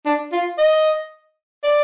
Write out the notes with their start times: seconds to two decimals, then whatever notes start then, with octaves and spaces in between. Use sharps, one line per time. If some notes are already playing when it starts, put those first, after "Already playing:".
0.05 D4
0.32 F4
0.58 D#5
1.64 D5